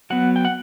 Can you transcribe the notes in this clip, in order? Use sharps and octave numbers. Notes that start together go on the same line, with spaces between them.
F#3 B3 F#5
G5
F#5